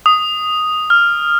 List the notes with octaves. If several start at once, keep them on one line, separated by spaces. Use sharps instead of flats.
D#6
F6